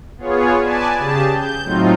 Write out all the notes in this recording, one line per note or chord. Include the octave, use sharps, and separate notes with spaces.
B3 F4 G#4 C#5
B4 D5 G#5 A5
C#3 G4 G#4 A5
G6
A2 F#3 C4 D#4 F4